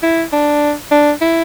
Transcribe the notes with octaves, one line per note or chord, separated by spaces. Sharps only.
E4
D4
D4
E4